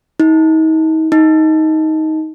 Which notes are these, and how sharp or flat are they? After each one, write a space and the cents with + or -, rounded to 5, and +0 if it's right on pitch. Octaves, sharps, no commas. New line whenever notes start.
D#4 +40
D#4 +15